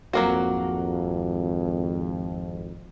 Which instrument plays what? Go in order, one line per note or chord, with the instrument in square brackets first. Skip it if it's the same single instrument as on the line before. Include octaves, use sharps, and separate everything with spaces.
[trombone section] G#1 F2 [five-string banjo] F#3 A#3 F#4